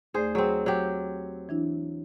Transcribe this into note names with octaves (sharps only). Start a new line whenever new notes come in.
D#2 A3 G#4 C5 D5
F#3 C4 G#4
F#3 G4
E3 D4 E4